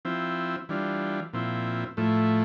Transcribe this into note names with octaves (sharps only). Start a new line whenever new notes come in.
F3 C4 E4
E3 G3 D4 F4
A#2 F3 C4 E4
A2 F3 A3 E4